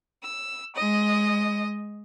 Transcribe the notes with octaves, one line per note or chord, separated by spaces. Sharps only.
E6
G#3 D#5